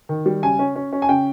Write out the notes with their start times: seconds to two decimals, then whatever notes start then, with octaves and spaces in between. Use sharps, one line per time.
0.09 D#3
0.26 G3
0.43 C#3 G#5
0.59 C#4
0.76 C#4
0.93 C#4
1.02 G#5
1.09 C#3 G5